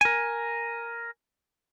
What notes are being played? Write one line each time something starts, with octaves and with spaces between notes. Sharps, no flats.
A#4 G#5